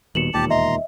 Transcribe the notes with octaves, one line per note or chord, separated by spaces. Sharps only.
D#1 D#2 B2 C#7 E7 F#7
E1 D#2 A#2 G4 A5
D#5 E5 A#5 C6